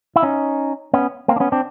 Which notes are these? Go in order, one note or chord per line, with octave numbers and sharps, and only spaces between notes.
E4
C#4 D#4
B3 C#4
A#3 C4
D4
B3 C#4
C4 D4